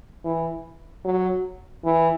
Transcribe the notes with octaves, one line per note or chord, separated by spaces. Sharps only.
E3
F#3
E3